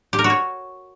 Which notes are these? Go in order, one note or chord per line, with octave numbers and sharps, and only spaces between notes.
G4
A#4
F#4
C#5